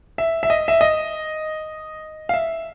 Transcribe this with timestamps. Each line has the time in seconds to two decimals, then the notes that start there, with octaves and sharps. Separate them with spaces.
0.18 E5
0.43 E5
0.50 D#5
0.68 E5
0.81 D#5
2.29 F5
2.34 E5